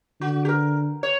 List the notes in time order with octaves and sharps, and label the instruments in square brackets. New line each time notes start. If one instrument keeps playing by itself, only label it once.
[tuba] D3 [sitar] F#4
[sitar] G4
A#4
C#5